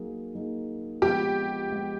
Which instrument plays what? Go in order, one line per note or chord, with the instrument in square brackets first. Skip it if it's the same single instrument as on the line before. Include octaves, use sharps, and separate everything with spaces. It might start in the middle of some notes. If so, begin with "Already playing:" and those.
Already playing: [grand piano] F#3 A#3 D#4 G#4
F#3 A#3 D#4 G#4
[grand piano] F3 G#3 B3 [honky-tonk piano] G4
[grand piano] F3 G#3 B3